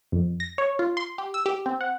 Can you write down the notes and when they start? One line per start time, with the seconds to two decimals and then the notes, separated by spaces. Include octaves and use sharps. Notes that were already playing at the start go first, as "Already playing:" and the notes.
0.12 F2
0.40 A#6
0.58 C#5
0.79 F4
0.97 C6
1.18 G4
1.34 E6
1.46 G4
1.66 C4
1.81 F#5